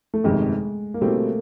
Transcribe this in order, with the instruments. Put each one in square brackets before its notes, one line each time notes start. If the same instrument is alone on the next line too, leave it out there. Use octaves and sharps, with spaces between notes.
[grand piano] A3
[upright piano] G1 F2 C3 D#3 [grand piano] G#3
[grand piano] A#3
[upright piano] B2 G3 C4 E4 G4 [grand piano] A3